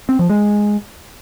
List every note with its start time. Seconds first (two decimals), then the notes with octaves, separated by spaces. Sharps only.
0.09 C4
0.19 F3
0.30 G#3